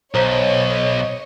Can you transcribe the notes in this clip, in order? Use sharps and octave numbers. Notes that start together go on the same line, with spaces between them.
B1 C5 C#5 D#5 A#5